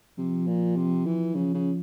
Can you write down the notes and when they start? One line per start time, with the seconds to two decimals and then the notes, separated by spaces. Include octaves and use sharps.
0.18 C3 F3
0.47 A#2
0.76 C3
1.06 E3
1.35 C#3 F3
1.54 C#3